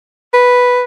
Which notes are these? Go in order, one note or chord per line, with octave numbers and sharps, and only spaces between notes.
B4